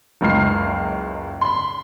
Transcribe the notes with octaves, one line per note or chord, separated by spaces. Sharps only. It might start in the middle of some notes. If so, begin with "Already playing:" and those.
F#1 C#2 G#3 F6 C7
B5 C6